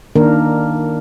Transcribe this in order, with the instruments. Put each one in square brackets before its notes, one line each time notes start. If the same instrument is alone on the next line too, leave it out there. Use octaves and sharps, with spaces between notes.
[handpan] D#3 A#3 D4 A#4